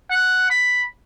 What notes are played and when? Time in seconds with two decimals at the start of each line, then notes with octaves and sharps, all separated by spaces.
0.11 F#5
0.50 B5